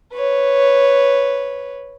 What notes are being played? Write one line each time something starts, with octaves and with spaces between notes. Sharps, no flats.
B4 C#5